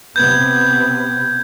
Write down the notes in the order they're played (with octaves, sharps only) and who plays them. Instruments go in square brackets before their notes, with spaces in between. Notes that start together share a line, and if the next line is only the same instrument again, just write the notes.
[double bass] C3 B3 [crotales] G6 G#6